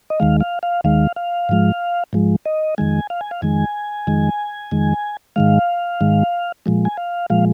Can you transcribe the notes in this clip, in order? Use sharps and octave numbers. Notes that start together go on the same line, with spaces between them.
D#5
D#2 D#3 G#3 F5
F5
F5
D#2 D#3 G#3 F5
F5
G#2 F3 G#3
G#2 F3 G#3
D#5
F2 D#3 G#3 G#5
F5
G#5
F5
F2 D#3 G#3 G#5
F2 D#3 G#3
F2 D#3 G#3
G#2 D#3 G#3 F5
G#2 D#3 G#3
A#2 F3 G#3
G#5
F5
A#2 F3 G#3 F5